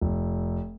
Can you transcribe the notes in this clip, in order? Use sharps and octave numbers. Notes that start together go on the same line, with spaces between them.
F1